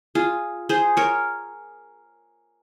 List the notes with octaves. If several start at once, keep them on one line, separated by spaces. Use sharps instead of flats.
F4 G#4
G#4 C5
A#4 C#5